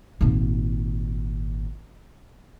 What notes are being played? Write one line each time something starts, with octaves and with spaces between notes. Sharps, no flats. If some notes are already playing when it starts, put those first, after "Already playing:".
G#1 A#2